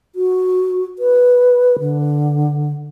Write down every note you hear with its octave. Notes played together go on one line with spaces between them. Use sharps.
F#4
B4
D3